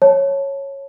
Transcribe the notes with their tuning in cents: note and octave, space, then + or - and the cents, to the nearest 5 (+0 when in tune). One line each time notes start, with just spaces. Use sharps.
C#5 -10 A5 +0